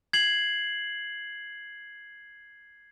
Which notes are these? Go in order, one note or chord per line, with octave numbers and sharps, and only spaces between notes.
G#6 C7 F#7